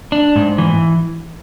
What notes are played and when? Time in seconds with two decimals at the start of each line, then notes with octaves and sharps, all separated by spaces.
0.12 D4
0.36 G#2
0.58 E3